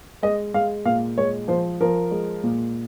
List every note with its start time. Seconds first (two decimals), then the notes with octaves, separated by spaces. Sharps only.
0.23 G#3 D#5
0.54 G#3 F5
0.85 A#2 F5
1.18 G#3 C#5
1.48 F3 C5
1.81 F3 A#4
2.11 G#3
2.44 A#2